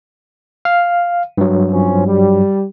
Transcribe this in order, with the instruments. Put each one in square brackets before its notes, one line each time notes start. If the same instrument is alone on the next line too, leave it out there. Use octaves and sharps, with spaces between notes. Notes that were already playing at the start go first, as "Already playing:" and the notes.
[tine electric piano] F5
G2 F#3
[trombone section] F3 C4 C#4
G3